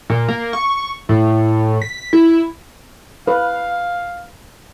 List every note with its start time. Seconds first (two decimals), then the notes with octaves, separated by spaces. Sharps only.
0.10 A#2
0.28 A#3
0.53 C#6
1.09 A2
1.82 B6
2.13 E4
3.27 B4 F5